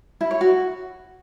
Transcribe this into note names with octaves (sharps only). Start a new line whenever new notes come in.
E4
C#5
F#4